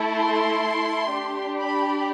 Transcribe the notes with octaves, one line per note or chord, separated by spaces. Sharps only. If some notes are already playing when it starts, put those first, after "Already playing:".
Already playing: A3 E4 A4
C6
D4 G4
B5